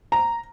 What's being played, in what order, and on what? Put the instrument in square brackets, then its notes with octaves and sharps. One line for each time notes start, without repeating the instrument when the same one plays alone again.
[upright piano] A#5